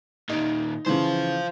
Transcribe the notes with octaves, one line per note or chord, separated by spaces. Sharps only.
A#2 D#3 D#4
C#3 E3 F4 C5